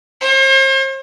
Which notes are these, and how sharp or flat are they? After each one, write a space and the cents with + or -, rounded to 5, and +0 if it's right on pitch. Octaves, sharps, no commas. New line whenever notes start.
C5 +45